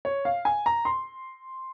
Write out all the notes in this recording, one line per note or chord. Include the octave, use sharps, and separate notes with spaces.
C#5
F5
G#5
A#5
C6